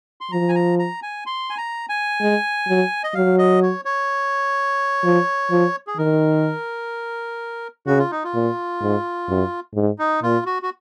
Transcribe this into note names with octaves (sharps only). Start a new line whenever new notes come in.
C6
F3 A#5
G#5
A#5
A#5
G#5
C6
G#5
A#5
G#5
G#3
F#3
D#5
F#3 F5
D#5
C#5
C#5
F3
F3
G#4
D#3 A#4
C#3 F#4
F4
D#4
F4
A#2
G#2
F#2
G#2
D#4
A#2 F4
F#4
F#4